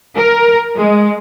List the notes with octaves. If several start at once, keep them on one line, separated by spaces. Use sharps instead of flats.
A#4
G#3